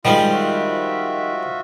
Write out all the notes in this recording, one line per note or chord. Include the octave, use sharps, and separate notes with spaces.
D#3 F3 G3 G#3 F4 C5 D#5
F4 F#4 E5